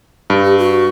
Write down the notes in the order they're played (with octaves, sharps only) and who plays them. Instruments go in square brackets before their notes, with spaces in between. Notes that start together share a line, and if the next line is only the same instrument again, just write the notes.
[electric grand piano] G2
[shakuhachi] G4
F#4